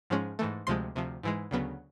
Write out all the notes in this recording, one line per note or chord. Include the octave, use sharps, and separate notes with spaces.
G#2 F3 G#3 C#4
G#2 E3 A3
D2 C3 F3 G#3 C6
D2 C3 F3
G#2 E3 G#3
D2 C#3 F#3 B3